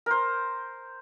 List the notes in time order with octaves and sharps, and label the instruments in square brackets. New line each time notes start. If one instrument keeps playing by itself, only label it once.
[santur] A#4 C5